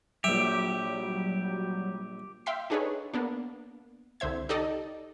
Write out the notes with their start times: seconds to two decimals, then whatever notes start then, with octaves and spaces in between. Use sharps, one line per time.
0.24 A#1 F#3 G3 G4 E5
2.46 E5 F5 G5 C6 B6
2.70 D4 D#4 G#4 A4 B4 C#5
3.14 A#3 B3 D4
4.20 C2 D3 C5 E5 G#6
4.49 D#4 G4 A4 D5 D#5